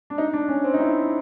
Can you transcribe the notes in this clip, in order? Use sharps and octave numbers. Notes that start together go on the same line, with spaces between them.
D4
D#4
D4
C#4
C4
D#4
E4